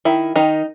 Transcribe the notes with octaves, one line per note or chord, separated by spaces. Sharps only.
D#3 E4
D#3 D#4